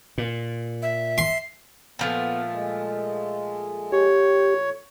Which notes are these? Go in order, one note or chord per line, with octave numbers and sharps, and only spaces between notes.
A#2
E5
C6
A#2 F3 A3 B3
G#3
G4 C#5